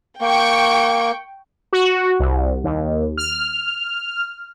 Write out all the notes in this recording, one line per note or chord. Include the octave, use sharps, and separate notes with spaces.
A#3 G5 C#6 D7
F#4
C2
D#2
F6